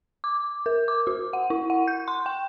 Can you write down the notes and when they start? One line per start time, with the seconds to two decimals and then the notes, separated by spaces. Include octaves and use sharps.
0.24 D6
0.66 A#4
0.88 D6
1.07 F#4
1.33 F#5
1.50 E4
1.70 F#5
1.88 G6
2.08 C6
2.26 G5